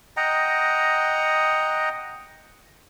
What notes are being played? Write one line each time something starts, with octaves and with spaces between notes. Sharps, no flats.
D#5 F#5 G5 A#5